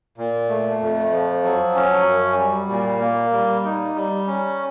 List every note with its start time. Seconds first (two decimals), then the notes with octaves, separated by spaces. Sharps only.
0.18 A#2
0.49 A3
0.80 F2
1.12 F3
1.44 F#3
1.75 C#4
2.07 F#2
2.38 G3
2.70 A#2
3.00 A#3
3.32 G3
3.64 D#4
3.95 G3
4.27 C#4